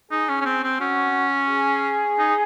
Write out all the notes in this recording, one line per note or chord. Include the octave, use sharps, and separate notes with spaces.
D#4 G#4
C#4
C#4
C4
C4
C#4 F#4
G#4
D#4